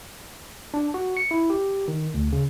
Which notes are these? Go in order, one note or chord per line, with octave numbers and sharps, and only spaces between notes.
D4
F#4
C#7
E4
G4
D#3
D2
C#3